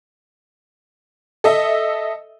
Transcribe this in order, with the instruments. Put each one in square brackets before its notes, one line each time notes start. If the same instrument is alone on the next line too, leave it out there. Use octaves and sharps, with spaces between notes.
[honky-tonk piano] A4 D#5 E5